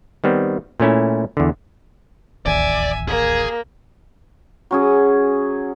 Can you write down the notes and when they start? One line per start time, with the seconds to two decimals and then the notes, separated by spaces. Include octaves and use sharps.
0.24 D#3 G3 B3 C4
0.80 A#2 A3 C#4 E4
1.37 E2 D3
2.46 D1 A1 D#2 D5 E5 G#5
3.08 A#3 G#4
4.71 F#3 C#4 G#4